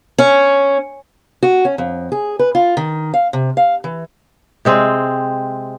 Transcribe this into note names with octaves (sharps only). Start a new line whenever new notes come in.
C#4
F#4
C#4
F2
G#4
B4
F4
D#3
F5
C3
F5
E3
C3 G#3 C4